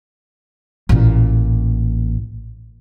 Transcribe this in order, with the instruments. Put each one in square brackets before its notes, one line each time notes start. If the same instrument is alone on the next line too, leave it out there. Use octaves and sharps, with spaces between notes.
[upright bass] A1 A#2